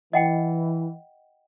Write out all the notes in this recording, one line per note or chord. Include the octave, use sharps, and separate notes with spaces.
E3 D#5 F#5 G5